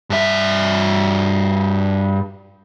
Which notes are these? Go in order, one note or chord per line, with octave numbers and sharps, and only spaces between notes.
G2 E5